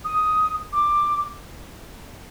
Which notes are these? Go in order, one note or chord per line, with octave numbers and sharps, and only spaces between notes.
D#6
D6